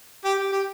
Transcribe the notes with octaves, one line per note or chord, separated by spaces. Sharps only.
G4
G4
G4